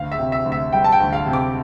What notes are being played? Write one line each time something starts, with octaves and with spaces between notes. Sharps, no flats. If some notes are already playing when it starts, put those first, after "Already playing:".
Already playing: D2 F5
E5
C3
E5
D2
E5
G3 G5
A5
G5
D2
F5
C3
D6